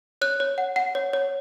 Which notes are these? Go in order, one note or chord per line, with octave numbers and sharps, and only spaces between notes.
C#5 F#6
C#5
F#5
F#5
C#5
C#5